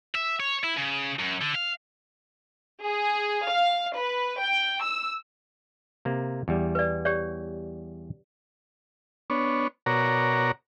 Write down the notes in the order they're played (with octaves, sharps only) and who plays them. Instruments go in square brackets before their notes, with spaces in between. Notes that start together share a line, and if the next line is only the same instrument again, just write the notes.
[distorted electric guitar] E5
C#5
E4
C#3
F#2
D3
F5
[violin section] G#4
F5
B4
G5
E6
[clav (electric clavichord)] C3 A#3
E2 G3
[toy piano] B4 D5
G4 C#5 D5
[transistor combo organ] B3 D4 C#5
B2 F#4 A#4 C#5 D5 A#5